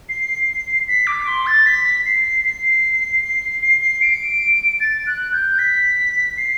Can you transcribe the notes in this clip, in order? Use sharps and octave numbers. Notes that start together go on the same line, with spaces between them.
C7
B6
D6
C6
A6
B6
C7
C7
C7
C7
C7
D7
A6
F#6
G6
B6
C7